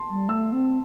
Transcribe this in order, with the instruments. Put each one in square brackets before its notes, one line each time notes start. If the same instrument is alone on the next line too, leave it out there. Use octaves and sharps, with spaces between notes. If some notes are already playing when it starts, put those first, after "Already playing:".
Already playing: [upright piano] A5 C6
[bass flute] G3
[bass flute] A3 [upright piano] E6
[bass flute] C4